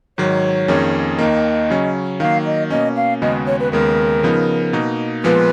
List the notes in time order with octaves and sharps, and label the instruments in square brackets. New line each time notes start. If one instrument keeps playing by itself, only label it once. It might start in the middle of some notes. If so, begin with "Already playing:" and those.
[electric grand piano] G#2 D#3 F#3 [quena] C#5
[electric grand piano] F2 D#3 A#3 C#4 G#4
[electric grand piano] D#2 D#3 A#3 [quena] D#5
[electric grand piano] C#3 F#3 C#4
[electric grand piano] D#3 F#3 A#3 [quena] F5
[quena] D#5
[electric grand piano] B2 A#3 C#4 [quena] D#5
[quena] F5
[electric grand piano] D#2 C#3 G#3 B3 F#4 [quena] D#5
[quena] C#5
B4
[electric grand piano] D#2 C#3 G#3 B3 [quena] A#4
[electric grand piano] C#3 F3 B3 D#4
B2 A#3 D#4
[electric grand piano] A#2 F3 G#3 B3 F4 [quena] B4